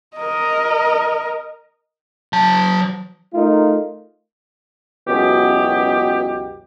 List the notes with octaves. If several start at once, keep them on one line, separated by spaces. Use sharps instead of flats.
A#4 D#5
F#3 A5
A3 D#4 F4 A#4
C#2 F#2 B2 E3 B3 G4